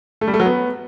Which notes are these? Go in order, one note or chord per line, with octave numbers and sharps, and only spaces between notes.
A3
G3
A3
F#3
B3